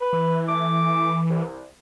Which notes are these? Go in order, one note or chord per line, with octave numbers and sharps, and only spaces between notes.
B4
E3
A3 D6
C2